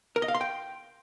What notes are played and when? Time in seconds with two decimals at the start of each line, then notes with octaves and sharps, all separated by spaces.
0.16 A#4
0.22 D#5
0.28 F5
0.34 C6
0.41 G5